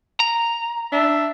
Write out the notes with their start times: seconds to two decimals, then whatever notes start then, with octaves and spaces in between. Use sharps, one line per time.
0.20 A#5
0.92 D4 E5